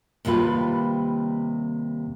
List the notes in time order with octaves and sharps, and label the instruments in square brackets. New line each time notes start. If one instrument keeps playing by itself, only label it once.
[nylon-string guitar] D#2 C3 G3 F4 B4